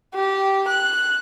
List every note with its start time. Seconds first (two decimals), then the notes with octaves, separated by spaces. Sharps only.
0.15 G4
0.68 F#6